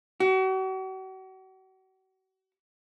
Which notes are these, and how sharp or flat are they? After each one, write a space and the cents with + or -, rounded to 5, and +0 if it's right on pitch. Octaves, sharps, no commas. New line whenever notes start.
F#4 +40